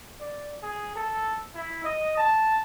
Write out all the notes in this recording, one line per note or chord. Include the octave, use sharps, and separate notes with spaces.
D5
G#4
A4
E4
D#5
A5